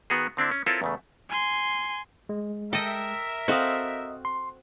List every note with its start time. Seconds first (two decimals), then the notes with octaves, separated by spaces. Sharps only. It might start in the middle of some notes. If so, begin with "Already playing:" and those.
0.10 D#3 B3 F#4 G#4
0.37 D3 C4 D4 E4
0.51 C#4
0.66 C4 E4 F4 A4 A#4 C#5
0.82 E2 C#3 A3
1.29 G#5 C6
2.29 G#3
2.73 A4 A#4 D#5 E5 G5
3.48 C4 F#4 A4 D#5 F5 D#6
4.25 C6